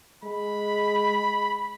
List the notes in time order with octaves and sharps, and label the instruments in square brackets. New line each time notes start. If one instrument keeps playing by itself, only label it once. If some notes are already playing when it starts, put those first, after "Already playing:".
[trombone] G#3 [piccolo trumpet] B5